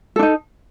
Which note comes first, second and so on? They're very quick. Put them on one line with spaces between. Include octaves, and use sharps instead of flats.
A4 D4 D#4